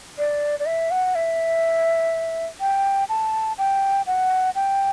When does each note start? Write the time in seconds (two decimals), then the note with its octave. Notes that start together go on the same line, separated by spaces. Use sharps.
0.18 D5
0.59 D5
0.66 E5
0.91 F#5
1.15 E5
2.60 G5
3.09 A5
3.58 G5
4.07 F#5
4.55 G5